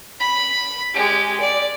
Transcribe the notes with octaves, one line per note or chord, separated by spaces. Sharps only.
B5
G#3 G4
D5